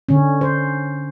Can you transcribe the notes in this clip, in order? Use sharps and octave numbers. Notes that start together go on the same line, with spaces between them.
D3 C#4
C5